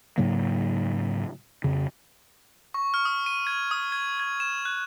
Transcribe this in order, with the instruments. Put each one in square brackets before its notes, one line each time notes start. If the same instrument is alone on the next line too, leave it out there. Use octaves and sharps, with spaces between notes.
[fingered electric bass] G#2 C#3 F#3 A#3
F2 C#3
[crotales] C#6
F6
D#6
D#7
G#6
D#6
G#6
G#6
E7
F#6